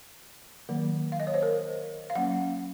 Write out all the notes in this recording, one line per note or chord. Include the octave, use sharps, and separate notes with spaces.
D#3 F#3 A#3
F5
D#5
C#5
C5
A#4
F5
F#3 A#3 C#4 F#5